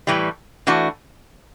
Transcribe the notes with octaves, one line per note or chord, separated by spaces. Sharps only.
A2 E3 G3
E3 A3 D4 F#4